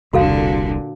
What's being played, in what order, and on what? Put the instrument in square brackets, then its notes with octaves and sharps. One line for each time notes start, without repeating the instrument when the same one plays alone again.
[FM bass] E1 [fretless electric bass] C2 [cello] A#2 D3 [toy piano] F#4 A4 F5